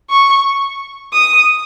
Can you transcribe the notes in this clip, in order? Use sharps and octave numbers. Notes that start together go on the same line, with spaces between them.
C#6
D#6